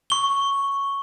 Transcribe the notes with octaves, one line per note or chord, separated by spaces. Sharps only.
C#6 G7